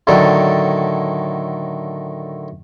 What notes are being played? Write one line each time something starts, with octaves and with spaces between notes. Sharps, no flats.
A2 D3 D#3 F#3 A4 D5